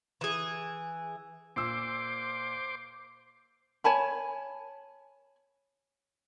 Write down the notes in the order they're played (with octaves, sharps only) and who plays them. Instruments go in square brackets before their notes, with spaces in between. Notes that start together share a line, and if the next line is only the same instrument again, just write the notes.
[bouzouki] E3 G#4
[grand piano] A#2 E6 [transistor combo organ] C5 D6
[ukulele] C#5 G#5 A5 B5